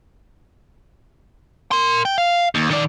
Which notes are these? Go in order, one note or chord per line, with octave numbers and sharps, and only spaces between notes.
A#4 C6
G5
F5
D#2
D#3 D5